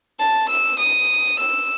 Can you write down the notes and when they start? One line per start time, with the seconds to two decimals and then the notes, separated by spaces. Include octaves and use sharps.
0.19 A5
0.50 E6
0.80 D#6
1.40 E6